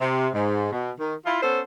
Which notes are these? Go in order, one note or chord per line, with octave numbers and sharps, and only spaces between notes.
C3
G#2
B2
D#3
E4 F4
B3 C#4 A4 C5